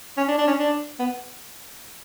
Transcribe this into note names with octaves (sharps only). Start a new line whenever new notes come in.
C#4
D4
D4
C#4
D4
B3